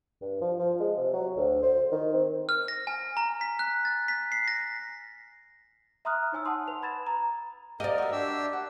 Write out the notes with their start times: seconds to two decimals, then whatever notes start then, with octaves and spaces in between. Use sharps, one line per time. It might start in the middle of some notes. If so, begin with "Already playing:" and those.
0.21 G2
0.41 F3
0.58 F3
0.80 G#3
0.97 C3
1.13 F#3
1.37 D2
1.62 C5
1.91 D#3
2.14 C4
2.49 F6
2.68 A#6
2.87 G#5
3.17 A#5
3.41 B6
3.59 F#6
3.85 A6
4.08 B6
4.32 C7
4.48 A#6
6.05 E5 A#5 C6 D#6 F6 F#6
6.32 D#4 C#5 G#5 E6
6.45 F#5 A5 C6 D#6
6.68 B4 F7
6.82 B5 G#6 A6 E7
7.07 A#5
7.80 G4 A#4 D5 D#5 F5 A#5
7.98 F#4 E5
8.12 D4 G4 E6
8.53 F#5